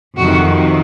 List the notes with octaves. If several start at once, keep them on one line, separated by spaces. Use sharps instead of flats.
F2 C3 D#3 F#4